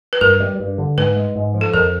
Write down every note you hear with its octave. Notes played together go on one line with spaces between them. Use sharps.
B4
G2 A#4
G3
G2
D3
G#2 B4
G#3
G#2
F3
A4
F2 A#4